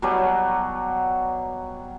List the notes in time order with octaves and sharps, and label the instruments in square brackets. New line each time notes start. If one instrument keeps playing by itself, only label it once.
[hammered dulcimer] B2 F#3 G3